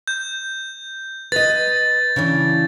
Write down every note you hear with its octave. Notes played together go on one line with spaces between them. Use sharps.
G6
B4 D#5 A6
C#3 E3 D4